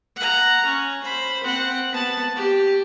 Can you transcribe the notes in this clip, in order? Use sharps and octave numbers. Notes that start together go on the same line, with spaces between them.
F#5 A#5
C#4
C5 B5
C4 F#5
B3 A5
G4